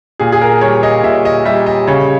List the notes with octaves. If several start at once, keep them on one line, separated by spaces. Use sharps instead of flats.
A#2 G#4
G#4
A#4
G3 C#5
D#5
A#2 E5
D#5
G3 E5
D#5
C#3 C#5